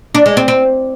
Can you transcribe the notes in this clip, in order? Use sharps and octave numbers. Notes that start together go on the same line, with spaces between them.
D4
G#3
C4
C4